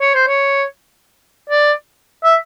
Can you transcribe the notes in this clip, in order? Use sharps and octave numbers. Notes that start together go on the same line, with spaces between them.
C#5
C5
C#5
D5
E5